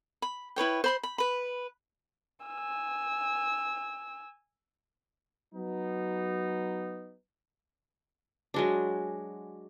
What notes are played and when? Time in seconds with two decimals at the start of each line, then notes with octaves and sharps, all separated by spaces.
0.22 B5
0.56 E4 B4 C#5 G5
0.84 C5 B5 C6
1.03 B5
1.18 B4 B5
2.46 G#5 E6
5.53 F#3 B3 D#4
8.54 F#3 G#3 D4